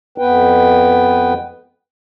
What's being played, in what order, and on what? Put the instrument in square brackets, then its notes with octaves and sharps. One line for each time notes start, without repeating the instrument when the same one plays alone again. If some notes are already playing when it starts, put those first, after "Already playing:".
[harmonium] F2 B3 B4 G5